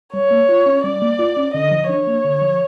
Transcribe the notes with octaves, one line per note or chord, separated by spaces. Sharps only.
G3 C#5
A#3
F4
C#4
G3 D5
A#3
F4
C#4
D3 D#5
F3
D4 C#5
A#3
D3
F3